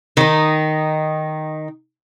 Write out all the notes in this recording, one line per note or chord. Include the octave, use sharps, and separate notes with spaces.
D#3 D#4